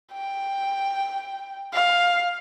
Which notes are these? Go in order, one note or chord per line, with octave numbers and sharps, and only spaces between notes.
G5
F5